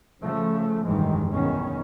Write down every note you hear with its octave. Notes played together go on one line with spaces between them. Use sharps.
C#3 F3 A3
F1 G2 D#3 E3 G3 G#3
B1 E2 D#3 C#4